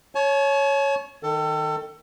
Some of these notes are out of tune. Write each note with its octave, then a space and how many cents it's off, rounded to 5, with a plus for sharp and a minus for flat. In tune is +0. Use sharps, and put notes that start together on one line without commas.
C#5 +0 A5 -45
D#3 +0 A4 +25